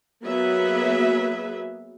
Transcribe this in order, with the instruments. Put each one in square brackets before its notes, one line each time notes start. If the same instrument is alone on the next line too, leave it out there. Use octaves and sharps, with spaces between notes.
[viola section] F#3 A#3 B3 G#4 B4 E5